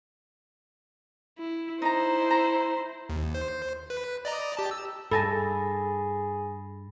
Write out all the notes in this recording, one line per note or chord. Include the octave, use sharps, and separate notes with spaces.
E4
D#4 E4 C5 A#5
A#5
D#2
C5
B4
D5 D#5 A#5
G4 A5
E6
G2 G#4 A4 G#5 A5 B5 A6 A#6